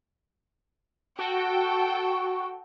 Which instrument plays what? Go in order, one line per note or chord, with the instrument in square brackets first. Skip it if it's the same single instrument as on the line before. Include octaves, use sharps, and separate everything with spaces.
[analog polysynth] F#4 [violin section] A4 G5